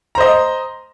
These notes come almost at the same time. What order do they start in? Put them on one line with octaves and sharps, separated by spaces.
A#5 C5 D#5